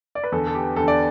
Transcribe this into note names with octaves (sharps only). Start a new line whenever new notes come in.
D5
B4
E2 D3 A4
A4
G4
E2 D3 A4
D5